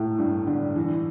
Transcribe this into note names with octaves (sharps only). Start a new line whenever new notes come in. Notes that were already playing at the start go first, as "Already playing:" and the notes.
Already playing: A2
G2
D3
E3